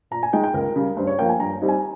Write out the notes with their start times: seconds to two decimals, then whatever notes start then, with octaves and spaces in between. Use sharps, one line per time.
0.11 A#2 A#5
0.23 G#5
0.33 G#3 D#4 G5
0.44 G5
0.54 C#2 A#4
0.76 C#3 G3
0.97 G2 C5
1.07 C#5
1.19 F3 A#3 G5
1.29 G#5
1.39 G2 A#5
1.61 G3 C4 D#4
1.68 G#5